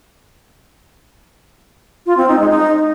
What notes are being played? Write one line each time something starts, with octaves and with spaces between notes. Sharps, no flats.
F4
C4
D#4
G#3
D#4